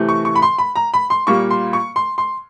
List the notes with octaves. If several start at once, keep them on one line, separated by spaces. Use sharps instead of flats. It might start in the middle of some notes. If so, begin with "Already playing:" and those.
Already playing: C3 E3 A3
C#6
C#6
B5
C6
B5
A#5
B5
C6
A#2 G3 A#3 C#6
C6
C#6
C6
C6